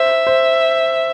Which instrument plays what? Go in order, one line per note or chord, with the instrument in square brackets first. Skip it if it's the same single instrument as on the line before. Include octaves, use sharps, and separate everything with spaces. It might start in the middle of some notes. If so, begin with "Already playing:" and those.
Already playing: [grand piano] C5 [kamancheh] E5
[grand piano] C5